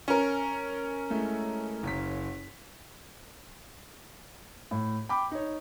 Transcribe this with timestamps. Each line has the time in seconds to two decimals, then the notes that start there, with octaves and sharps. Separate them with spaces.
0.08 C#4 A#4
1.10 G#3 A3 E4
1.83 F#1 B6
4.71 A2
5.09 G5 B5 D6
5.31 D#4 C#5